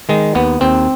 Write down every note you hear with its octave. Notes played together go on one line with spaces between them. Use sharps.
D#3 G#3
D#2 B3
D#2 C4